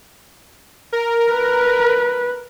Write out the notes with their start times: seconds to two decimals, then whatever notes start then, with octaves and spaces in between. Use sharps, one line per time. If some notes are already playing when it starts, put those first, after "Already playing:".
0.93 A#4
1.31 B4